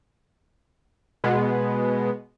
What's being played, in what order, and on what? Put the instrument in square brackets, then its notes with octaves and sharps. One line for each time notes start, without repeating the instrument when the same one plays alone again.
[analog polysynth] B2 G#3 B3